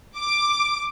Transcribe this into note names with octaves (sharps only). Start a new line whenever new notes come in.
D6